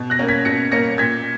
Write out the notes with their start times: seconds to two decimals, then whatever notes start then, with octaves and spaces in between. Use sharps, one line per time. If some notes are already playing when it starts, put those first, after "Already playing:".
Already playing: B2
0.10 F#6 A#6
0.19 A#3 C#4
0.28 G#6 B6
0.45 B2 A#6 C#7
0.72 A#3 C#4 A#6 C#7
0.98 A#2 G#6 B6